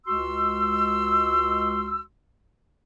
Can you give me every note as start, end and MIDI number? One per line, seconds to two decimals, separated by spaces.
0.07 2.02 37
0.07 2.02 56
0.07 2.02 66
0.07 2.02 84
0.07 2.02 88